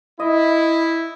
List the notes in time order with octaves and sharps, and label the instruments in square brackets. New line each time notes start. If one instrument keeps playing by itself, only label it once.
[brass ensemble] E4 [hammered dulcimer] D#5